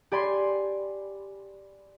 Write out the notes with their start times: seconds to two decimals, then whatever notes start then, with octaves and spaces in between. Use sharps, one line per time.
0.12 G4 D5 G#5 B5 C6